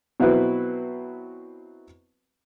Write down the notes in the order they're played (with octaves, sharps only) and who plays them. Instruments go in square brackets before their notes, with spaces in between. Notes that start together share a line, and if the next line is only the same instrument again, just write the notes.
[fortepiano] B2 F#3 C4 E4 F#4 B4